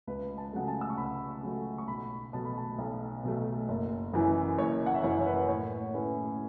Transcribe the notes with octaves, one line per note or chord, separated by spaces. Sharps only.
C#2 B4
A5
C#3 F#3 A3 F#5
A5
E6
C#6
C#2 B5
C#3 F#3 A3
C#6
B1 B5
B2 F#3 A3 A5
B5
A5
B1
B2 F#3 A3
F#1
F#2 E3 C#4 E4
F#1 C#5
F#5
E5
F#2 E3 C#4 E4 C#5
C#5
B4
A2 C#5
A3 C#4 E4 B4